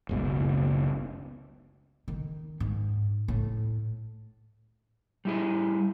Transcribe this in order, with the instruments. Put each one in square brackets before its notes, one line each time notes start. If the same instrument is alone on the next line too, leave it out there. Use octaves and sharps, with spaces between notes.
[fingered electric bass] F#1 C#2 B2
[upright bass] D#3
G#2
A2
[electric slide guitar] G3 E4 G#4